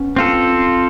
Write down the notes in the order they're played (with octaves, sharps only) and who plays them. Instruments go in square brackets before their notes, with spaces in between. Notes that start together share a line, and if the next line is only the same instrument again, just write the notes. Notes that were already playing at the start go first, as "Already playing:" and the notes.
Already playing: [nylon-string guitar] B3 C#4
[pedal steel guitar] C4 F4 A4